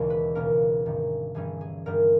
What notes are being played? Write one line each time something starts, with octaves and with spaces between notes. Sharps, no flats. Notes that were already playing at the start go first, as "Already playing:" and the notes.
Already playing: E1 D#2 C#3 E3
B4
C#2 B2 A#3 C#4 A#4
G1 G2 D#3
G1 G2 E3 G3 C#4 G#4
G#4
G1 G2 G3 B3 A#4